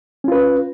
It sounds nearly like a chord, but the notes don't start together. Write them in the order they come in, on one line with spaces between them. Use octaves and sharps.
C#4 F4 B4